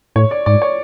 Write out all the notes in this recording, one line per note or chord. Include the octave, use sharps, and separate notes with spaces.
A2 C#5
D5
G#2 D5
C#5